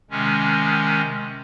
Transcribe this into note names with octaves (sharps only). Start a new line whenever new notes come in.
C3 D#3 G#3 C#4